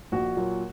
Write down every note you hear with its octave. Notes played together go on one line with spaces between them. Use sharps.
A#1 F#4
A#2 F#3